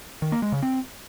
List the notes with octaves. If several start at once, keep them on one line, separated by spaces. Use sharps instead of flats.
D#3
A#3
G#3
C#3
C4